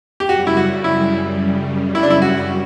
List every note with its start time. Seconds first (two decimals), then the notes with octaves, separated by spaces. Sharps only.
0.20 G4
0.29 F#2 C#3 G3 F#4
0.47 E4
0.57 F#4
0.84 E4
1.95 E4
2.03 D4
2.10 E4
2.22 F#4